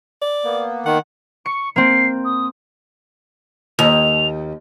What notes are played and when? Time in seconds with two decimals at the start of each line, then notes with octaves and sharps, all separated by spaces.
0.22 D5
0.44 A#3 B3
0.86 D#3 F#5
1.46 C#6 C#7
1.76 A#3 C4 C7
2.25 D#6
3.79 D#2 F7